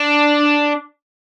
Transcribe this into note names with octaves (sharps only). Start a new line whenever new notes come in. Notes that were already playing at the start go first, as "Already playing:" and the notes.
Already playing: D4